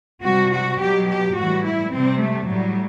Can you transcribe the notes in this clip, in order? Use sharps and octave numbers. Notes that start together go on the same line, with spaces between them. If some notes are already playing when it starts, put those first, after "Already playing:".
C3 G3 F#4
F#4
B2 F#3 G4
G4
A2 E3 G3 F#4
E4
C3 G3 C4
A3
A2 F#3 G3